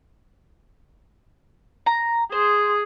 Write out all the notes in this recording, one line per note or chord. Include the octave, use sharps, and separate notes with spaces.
A#5
G#4 C5